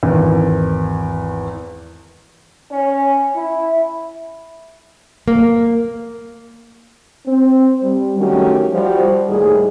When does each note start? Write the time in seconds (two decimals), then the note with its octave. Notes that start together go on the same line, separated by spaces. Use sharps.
0.03 G#1 E2
2.71 C#4
3.34 E4
5.28 A#3
7.26 C4
7.82 G3
8.18 D#3 F#3 A3 C#4 F#4 G4
8.72 F3 G3 F#4
9.27 D#2 A2 G3 D#4 G#4